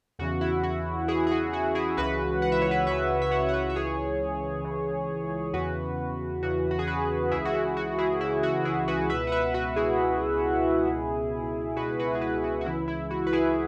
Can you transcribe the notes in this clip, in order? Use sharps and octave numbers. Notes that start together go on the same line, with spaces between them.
E2 C#3 E3 F#4
E4
F#4
E2 C#3 E3 E4 G#4
G#4
F#4
F#4
E4 G#4
C#2 C#3 E3 F#4 B4
F#5
E5
C#5
B4 E5
C#2 C#3 E3 B4 E5
E5
C#5 F#5
F#5
B4 E5
E5
C#2 C#3 E3 G#4 C#5
C#2 C#3 E3
E2 C#3 E3 F#4 B4
E2 C#3 E3 F#4
F#4
G#4
F#4 B4
C#2 C#3 E3 E4 G#4
F#4
E4
F#4
E4 G#4
C#2 C#3 E3 E4
F#4
E4 G#4
F#4 B4
C#2 B2 B4 E5
F#5
B4 E5
F#4 B4
E4 G#4
C#2 B2
C#2 B2
C#2 B2 F#4 B4
F#4 B4
G#4
F#4 B4
F#4
F#4
C#2 C#3 E3 E4
E4
F#4
B4
E4 G#4